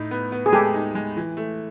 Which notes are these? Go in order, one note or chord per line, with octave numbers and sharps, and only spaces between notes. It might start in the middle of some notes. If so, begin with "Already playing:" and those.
Already playing: A2 D#4
B3
B3
G#4
G#3 G4 A4
D#4
G#3
E3
A3